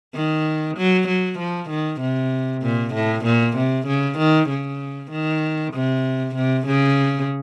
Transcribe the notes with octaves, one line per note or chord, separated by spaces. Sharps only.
D#3
F#3
F#3
F3
D#3
C3
A#2
A2
A#2
C3
C#3
D#3
C#3
D#3
C3
C3
C#3